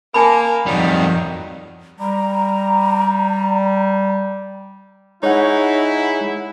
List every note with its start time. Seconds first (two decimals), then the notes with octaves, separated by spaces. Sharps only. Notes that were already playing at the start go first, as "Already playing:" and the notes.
0.14 A#3 G#5 A5 B5
0.66 F2 D#3 F#3 G3
1.99 G3 A#5
5.23 G#3 D#4 E4 G#4 C#5 F#5